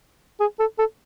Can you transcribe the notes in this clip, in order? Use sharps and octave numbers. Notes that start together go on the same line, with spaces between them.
G#4
A4
A4